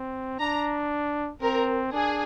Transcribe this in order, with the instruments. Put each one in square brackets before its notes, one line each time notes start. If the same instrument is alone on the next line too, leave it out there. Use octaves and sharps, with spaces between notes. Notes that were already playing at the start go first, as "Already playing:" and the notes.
Already playing: [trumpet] C4
[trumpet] D4 [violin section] A#5
[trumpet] C4 [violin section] A#4
[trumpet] D4 [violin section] G#4